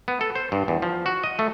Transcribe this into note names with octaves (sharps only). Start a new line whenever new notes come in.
B3
A4
C5
G2
E2
F3
F#4
D#5
A3